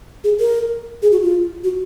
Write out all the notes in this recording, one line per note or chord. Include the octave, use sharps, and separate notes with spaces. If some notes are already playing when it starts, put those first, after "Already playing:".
G#4
A#4
G#4
F#4
F4
F#4